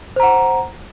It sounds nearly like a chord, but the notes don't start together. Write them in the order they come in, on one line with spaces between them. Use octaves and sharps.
C5 A#5 F#5